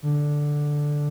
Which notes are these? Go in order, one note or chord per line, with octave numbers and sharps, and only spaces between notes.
D3